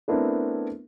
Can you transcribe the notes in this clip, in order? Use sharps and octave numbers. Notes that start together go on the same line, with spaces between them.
A3 B3 C4 D4 E4 A#4